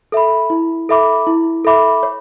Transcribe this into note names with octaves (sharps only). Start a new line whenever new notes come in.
A4 E5 B5
E4
A4 E5 B5 D6
E4
A4 E5 B5 D6
C#5